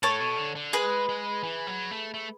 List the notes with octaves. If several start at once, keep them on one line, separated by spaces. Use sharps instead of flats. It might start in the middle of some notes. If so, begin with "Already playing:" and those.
A2 A4 C#5
B2
D3
D3
G#3 G#4 B4
G#3
E3
F#3
A3
A3